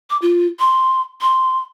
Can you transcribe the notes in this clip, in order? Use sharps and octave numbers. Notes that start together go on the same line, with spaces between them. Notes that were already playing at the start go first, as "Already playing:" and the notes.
D6
F4
C6
C6